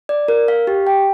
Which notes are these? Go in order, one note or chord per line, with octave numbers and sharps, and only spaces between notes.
D5
A#4
F5
G4
G5